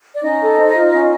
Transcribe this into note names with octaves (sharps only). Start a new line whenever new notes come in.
D5
C#4 D#4 D#5
A4
C5
F4
C#4